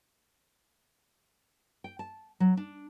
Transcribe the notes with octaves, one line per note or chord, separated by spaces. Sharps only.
G5
A5
F#3
D4